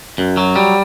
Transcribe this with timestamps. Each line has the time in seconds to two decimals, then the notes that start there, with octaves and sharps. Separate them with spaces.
0.18 F#2
0.37 F#3
0.56 G3